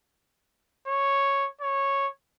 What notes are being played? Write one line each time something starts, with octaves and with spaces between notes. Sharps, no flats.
C#5
C#5